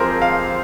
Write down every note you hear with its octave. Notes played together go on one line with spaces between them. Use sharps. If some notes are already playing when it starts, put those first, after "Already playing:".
Already playing: F3 G#3 C4 G4 G#4 A#4
F5